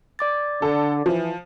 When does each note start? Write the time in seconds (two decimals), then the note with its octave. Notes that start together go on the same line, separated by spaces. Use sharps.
0.19 D5 D6 A6
0.62 D3 A4
1.06 E3 F3